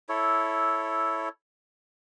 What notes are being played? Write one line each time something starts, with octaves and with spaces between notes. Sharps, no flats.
E4 A4 C#5